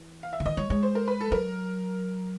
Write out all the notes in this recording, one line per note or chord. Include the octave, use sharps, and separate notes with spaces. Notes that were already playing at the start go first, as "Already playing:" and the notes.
Already playing: E3
F5
E5
D3
D#3 D#5
G3 C#5
G#3 C#5
C5
A#4
B4
A4
F#3 A#4